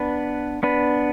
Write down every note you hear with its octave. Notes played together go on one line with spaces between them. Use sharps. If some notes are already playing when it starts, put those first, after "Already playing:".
Already playing: B3 D4 B4
B3 D4 B4